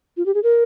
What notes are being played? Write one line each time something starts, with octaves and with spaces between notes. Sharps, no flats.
F4
G4
G#4
A#4